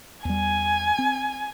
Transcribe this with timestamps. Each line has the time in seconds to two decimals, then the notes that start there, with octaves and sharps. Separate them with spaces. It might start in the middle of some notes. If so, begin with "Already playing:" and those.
0.25 E2 G3 G#5
0.98 C4